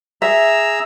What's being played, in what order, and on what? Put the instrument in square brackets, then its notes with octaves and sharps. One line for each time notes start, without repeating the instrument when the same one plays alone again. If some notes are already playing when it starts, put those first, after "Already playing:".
[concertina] G#4 A#5 E6 [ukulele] E5